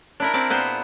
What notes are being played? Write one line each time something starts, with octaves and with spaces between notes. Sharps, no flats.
D4 E4 A#4
C4 E4 A#4 D5
A#2 B3 G#4 C5